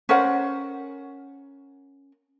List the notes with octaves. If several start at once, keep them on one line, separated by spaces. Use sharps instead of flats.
C#4 A#4 C5 F#5